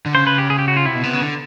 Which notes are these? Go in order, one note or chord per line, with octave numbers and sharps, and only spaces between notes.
D3
C#3 C5
B4
G4
G#4
G4
F#4
F4
C3 E4
B2
C3 B3
C#3
D3